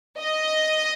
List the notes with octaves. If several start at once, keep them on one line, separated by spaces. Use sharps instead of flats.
D#5